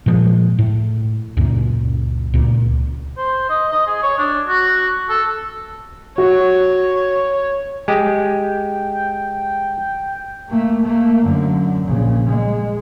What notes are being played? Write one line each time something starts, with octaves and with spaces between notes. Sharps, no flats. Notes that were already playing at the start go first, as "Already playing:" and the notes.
A#2 F3 F#3 G#3
A2
C#2 F#2 A#2
C#2 A#2
C5
D#5
D#5
G#4
C#5
D4
F#4
A4
F#4 C#5
G#3 G4 G5
A3 A#3
A3 A#3
F#2 D3
A#1 C#3
G#3